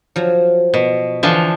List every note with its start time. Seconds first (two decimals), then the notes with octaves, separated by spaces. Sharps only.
0.16 F3 F#3
0.74 B2
1.23 D3 E3 F3